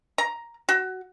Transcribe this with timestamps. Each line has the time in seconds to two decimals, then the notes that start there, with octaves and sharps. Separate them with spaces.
0.18 A#5
0.69 F#4